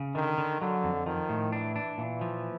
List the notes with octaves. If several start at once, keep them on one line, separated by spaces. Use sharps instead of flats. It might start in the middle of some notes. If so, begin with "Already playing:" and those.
Already playing: C#3
D3 D#3
D3
D3 F#3
F2
D#3 F3
A2
E3 D4
D4
A#2 E3
F3